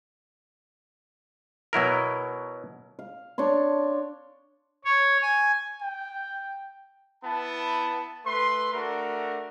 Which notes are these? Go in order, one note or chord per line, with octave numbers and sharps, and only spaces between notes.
B2 F#3 E4 A#4
F5
D4 C#5 A5 C6
C#5
G#5
G5
B3 E4 A5
A3 B4 C6
A3 D4 F#4 A#4